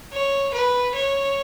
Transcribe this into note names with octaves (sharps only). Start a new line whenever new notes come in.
C#5
B4
C#5